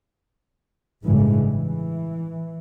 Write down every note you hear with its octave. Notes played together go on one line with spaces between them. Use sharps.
A1 G2 C#3 E3 G#3
E3